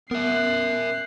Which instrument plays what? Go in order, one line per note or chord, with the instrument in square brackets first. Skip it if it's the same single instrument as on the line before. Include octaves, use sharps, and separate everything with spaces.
[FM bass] B3 [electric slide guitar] A#4 E5 [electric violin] F#6 C7